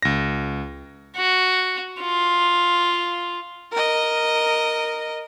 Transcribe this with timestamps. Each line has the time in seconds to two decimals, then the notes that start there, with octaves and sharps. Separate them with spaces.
0.03 C#2 A#6
1.16 F#4
2.01 F4
3.72 A#4 D#5